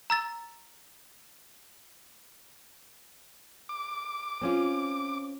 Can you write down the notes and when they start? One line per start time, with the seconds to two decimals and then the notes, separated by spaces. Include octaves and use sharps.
0.10 A#5 E6 A6
3.69 D6
4.41 C4 C#4 F4